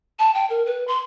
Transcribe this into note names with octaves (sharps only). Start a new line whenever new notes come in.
A5
G5
A#4
B4
C6